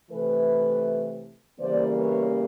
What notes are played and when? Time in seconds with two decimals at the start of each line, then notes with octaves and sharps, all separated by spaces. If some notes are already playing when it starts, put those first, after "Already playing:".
0.11 C3 E3 A3 A4 B4
1.59 E2 C#3 E3 G3 A#3 C5 D5
1.96 B4 C#5